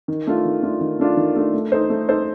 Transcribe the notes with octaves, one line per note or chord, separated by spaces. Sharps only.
D#3
A3 D4 F4
D#3
A3 D4 F4
D#3
A3 D4 F4
D#3
A3 D4 F4
A3
D#4 A4 C5
A3
D#4 A4 C5